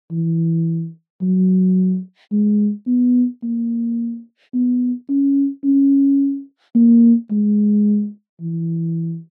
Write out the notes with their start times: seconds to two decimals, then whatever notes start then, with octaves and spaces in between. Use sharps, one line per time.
0.11 E3
1.21 F#3
2.32 G#3
2.87 B3
3.43 A#3
4.54 B3
5.09 C#4
5.64 C#4
6.75 A#3
7.31 G#3
8.41 E3